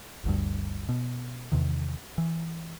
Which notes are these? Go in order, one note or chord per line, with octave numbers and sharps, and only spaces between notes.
G1 D2 G2
B2
E2 C3 D#3
E3